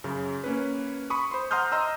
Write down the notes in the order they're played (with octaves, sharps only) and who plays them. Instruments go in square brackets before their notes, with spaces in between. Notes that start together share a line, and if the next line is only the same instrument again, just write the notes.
[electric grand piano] F#2 C#3
A#3 C#4 B4
B5 C#6 D#6
C5 C6
F#5 A#5 C6 D#6 F6 G6
D#5 A#5 C6 E6